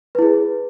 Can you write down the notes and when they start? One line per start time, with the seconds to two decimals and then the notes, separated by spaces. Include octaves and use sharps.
0.15 B4
0.19 E4
0.22 G#4